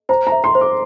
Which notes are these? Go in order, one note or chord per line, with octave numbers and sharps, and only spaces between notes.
C5 A#5
A#5
E5
C6
C5
D6